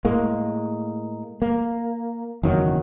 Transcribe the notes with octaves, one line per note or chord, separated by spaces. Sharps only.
A2 G#3 A#3
A#3
F#1 E2 D#3 F#3